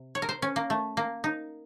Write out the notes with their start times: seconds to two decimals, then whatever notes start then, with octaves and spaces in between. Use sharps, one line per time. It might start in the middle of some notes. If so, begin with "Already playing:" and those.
Already playing: C3
0.15 C#5
0.22 A#4
0.29 C5
0.42 C#4
0.56 A#3
0.70 A3
0.97 A#3
1.24 D#4